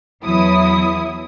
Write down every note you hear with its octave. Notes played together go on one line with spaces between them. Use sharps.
E2 E3 F#3 E4 D#6